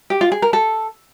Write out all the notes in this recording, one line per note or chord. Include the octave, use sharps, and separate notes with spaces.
G4
F4
G#4
A#4
A4